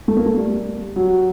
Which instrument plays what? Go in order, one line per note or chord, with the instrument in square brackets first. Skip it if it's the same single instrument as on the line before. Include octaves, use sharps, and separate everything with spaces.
[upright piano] A3
A#3
A3
G3
F#3